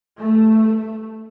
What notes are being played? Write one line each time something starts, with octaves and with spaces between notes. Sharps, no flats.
G2 A3